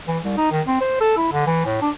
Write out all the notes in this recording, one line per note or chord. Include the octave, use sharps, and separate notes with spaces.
E3
C2
D#4
D#3
C4
C5
A4
E4
D3
E3
A2
D4